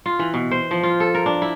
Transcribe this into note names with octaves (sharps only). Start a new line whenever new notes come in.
F4
E3
B2
C5
F3
F4
A4
A#4
D4
E4